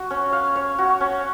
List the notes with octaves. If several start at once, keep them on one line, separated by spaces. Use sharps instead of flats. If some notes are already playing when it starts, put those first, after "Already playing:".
Already playing: F#4
C#4
F5
C#5
F#4
C#4